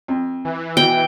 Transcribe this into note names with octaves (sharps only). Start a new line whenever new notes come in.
F2
E3
B2 G5